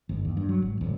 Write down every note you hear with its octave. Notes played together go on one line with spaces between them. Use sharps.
G1
D#2
G2
F#3
G#1
D1